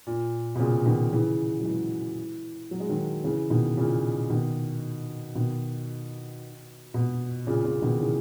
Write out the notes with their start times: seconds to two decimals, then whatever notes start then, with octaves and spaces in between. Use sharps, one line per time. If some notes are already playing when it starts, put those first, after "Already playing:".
0.07 A#2
0.55 B2
0.59 A#2 C#3
0.86 B2 D#3
1.12 C#3 E3
1.60 F#3
1.65 E3 G#3
2.71 F#3
2.80 G#3
2.89 D#3 F#3
3.24 C#3 E3
3.50 B2 D#3
3.77 A#2 C#3
4.30 B2 D#3
5.35 B2 D#3
6.94 B2
7.47 A#2 C#3
7.64 A#2 C#3
7.82 B2 D#3
8.00 C#3 E3